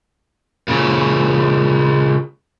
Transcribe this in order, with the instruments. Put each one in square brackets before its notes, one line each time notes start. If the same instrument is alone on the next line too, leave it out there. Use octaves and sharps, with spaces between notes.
[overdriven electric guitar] A#2 C#3